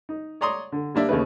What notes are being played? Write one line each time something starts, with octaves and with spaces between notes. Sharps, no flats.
D#4
C#5 D5 A#5 C6 C#6 D#6
D3
G3 A#3 D4 E5
D#2 C#3 A3 D#4 B4